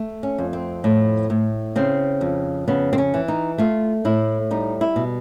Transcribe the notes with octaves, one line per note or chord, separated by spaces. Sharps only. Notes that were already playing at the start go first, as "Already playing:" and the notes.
Already playing: A3
C#4
F2
C4
A2
A2
C#3 C4
F2
C#3 B3
C4
C#4
E3
D#4
A3 F4
A2 E4
G3 D#4
E4
B2